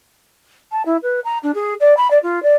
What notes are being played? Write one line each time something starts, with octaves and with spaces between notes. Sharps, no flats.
A5
E4
B4
A#5
D4
G#4
D5
B5
D5
F4
D5